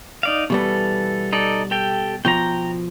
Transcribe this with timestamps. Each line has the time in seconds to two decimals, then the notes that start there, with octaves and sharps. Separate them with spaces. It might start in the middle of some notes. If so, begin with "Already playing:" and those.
0.23 D#4 D5 F5
0.50 B2 E3 G3 B3 A4
1.33 D#4 A4 D5
1.71 G4 A4 G5
2.25 B2 F3 G5 A#5